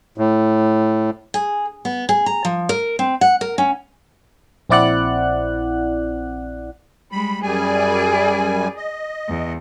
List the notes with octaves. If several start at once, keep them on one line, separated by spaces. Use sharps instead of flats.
A2
G#4
B3
G#4
A#5
F3
A#4
C4
F#5
A#4
C#4
A#1 C4 E4 D5 F#5 F#6
G3 G#3 B5
F#2 G3 G#4 D5 G#5
D#5
E2